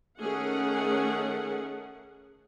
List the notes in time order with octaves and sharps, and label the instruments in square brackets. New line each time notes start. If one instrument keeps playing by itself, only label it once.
[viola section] D#3 A3 C#4 G#4 F#5